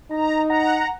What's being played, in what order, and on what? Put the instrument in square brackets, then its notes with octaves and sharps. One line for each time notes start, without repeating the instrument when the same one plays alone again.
[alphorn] D#4 [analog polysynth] A#5
[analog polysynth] F#5 A#5 A#6